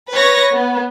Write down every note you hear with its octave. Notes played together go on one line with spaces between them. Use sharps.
B4 C#5 C#6 A#6
B3